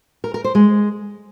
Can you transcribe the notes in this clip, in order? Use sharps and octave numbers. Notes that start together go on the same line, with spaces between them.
A#4
A#4
C5
G#3